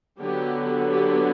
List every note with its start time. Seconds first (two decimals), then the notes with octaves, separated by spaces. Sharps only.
0.20 D3 F#3 B3 G4
0.91 G4